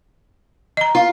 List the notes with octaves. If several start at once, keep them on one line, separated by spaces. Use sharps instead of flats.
D#5 A#5
F4